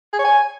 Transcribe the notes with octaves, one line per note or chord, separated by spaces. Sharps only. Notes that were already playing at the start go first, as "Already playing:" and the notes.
G#4
C#5
G#5